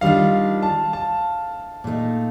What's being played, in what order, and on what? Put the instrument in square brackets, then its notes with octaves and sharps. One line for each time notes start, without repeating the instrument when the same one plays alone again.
[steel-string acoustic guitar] D#3 G3 D4 F4 [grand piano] F5
[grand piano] A5
A5
[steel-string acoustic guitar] A#2 A3 D#4